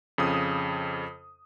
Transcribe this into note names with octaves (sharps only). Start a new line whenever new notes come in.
F2 C#3 D#6